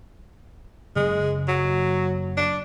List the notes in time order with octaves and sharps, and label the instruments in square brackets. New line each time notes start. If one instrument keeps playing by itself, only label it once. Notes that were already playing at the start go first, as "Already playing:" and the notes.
[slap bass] F#1 C#3 [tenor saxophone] G#3
[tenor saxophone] F#3
D4